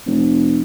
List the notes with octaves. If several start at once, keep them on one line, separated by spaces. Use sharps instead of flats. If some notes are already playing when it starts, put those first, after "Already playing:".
F1